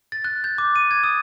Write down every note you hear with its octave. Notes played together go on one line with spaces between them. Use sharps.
A6
F#6
G6
D6
D#7
G#6
D#6